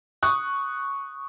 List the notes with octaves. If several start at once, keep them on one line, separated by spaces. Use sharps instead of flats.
C#6 D#6 F#6